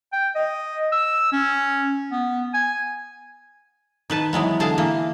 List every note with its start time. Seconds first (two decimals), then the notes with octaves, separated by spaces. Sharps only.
0.13 G5
0.35 D#5
0.92 E6
1.33 C#4
2.12 B3
2.54 G#5
4.10 D#3 B4 A5
4.33 E3 F#3 G#3 B3
4.60 D3 G#4 F5 A5
4.78 E3 A#3